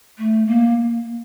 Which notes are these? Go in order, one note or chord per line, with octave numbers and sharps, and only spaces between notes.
A3
A#3